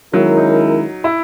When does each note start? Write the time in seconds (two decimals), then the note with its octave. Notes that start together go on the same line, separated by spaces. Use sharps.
0.14 D#3 F#3 G#3 C#4 E4 A#4
0.37 D#4
1.04 E4